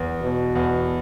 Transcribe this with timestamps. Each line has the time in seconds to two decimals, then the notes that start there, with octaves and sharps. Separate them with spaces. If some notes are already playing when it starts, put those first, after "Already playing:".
Already playing: E2
0.23 B2
0.55 E2